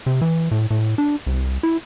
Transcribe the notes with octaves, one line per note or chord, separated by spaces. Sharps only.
C3
E3
A2
A2
D4
C2
E4